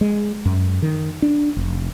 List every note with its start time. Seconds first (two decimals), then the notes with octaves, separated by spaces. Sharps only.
0.01 G#3
0.45 F#2
0.82 D#3
1.22 D4
1.57 F1